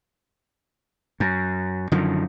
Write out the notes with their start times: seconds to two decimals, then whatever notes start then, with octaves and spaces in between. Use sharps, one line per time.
1.20 F#2
1.92 F#2 D3 D#3 F3